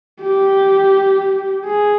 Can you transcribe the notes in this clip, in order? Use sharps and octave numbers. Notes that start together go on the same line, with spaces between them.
G4
G#4